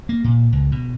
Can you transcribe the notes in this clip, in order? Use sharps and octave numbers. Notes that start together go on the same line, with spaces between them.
A#3
A#2
C#2
B2